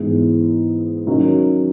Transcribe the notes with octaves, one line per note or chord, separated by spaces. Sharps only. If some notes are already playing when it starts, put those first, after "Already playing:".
Already playing: G#2 E3 B3 E4 G#4
D#3 F#3 C#4